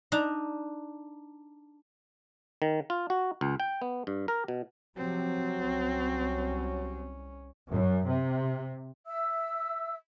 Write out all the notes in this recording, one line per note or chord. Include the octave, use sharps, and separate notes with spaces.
D4 D#4 A#5
D#3
F4
F#4
C#2
G5
B3
G2
A#4
B2
C3 F3 F#3 C4
C2 C#4
F#2
C3
E5 E6